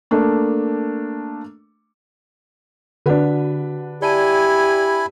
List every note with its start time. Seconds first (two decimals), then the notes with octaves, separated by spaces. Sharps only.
0.11 A3 A#3 D4
3.06 D3 D4 F#4 B4 F#5
4.02 E4 G4 D5 G#5 A5 B5 D#7